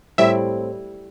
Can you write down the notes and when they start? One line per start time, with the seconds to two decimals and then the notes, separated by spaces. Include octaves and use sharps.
0.18 A2 G3 C4 E4 E5